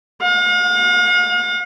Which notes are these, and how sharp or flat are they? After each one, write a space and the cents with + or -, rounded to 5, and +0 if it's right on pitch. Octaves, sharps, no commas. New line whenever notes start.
F5 +45